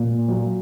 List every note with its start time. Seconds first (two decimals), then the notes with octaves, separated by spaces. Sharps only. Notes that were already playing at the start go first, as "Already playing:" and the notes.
Already playing: A#2
0.28 F#3